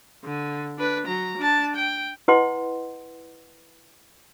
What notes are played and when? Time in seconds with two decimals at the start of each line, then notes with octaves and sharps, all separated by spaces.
0.24 D3
0.78 D4 B4
1.07 F#3 A#5
1.38 D4 A5
1.76 G5
2.28 E4 B4 D#5 F#5 C6